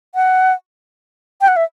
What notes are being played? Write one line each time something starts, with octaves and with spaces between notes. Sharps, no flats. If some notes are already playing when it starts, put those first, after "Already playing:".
F#5
G5
F#5
E5